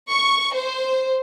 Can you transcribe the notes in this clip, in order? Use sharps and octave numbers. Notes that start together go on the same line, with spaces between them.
C#6
C5